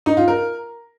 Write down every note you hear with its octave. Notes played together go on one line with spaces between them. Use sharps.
D#4
F4
A#4